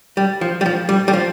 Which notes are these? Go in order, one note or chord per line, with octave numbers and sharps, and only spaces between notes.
G3
F3
G3
F3
G3
G3
F3